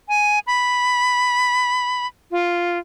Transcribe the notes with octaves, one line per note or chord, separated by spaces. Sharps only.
G#5
B5
F4